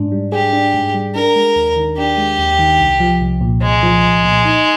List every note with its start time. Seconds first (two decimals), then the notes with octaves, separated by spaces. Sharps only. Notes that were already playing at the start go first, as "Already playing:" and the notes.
Already playing: G#2 D4
0.12 G3
0.32 G4 G#4
0.53 D4
0.74 G#2
0.94 G3
1.15 D4 A#4
1.36 G#3
1.56 D#2
1.76 D#3
1.97 D4 G4
2.17 G#3
2.39 D#2
2.59 D#3
2.80 C2
3.00 F3
3.21 C2
3.41 A#2
3.62 C2 G#3
3.83 F3
4.03 C2
4.25 A#2
4.45 D#4